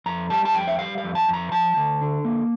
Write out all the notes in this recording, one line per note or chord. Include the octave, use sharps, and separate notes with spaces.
F2 A#5
G3 A5
A5
F2 G5
E5
G3 F5
F5
F2
A5
F2 A#5
F3 A5
D2
D3
A#3